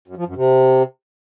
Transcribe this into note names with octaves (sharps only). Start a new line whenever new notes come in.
F#2
F3
F#2
C3